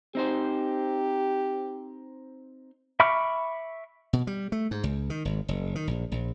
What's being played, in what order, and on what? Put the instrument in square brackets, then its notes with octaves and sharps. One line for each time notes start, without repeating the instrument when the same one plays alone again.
[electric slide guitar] C4 D#4 C5 [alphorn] G4
[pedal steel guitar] E5 B5 C#6 D6 F6
[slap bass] B2
G3
A3
G#2
C#2
D#3
G#1
F#1
D#3
A#1
A#1